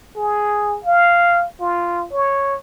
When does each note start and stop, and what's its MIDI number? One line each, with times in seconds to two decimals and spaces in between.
0.16 0.78 68
0.84 1.45 77
1.60 2.07 65
2.12 2.55 73